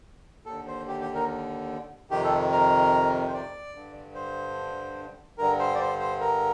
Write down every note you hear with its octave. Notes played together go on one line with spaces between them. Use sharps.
D#2 D3 A4
C5
G4
G4
A#4
F2 C3 D#3 G4
A4
A#4
C5
D5
G2 D3
C5
G2 D3 A#4
C5
D5
C5
C5
A#4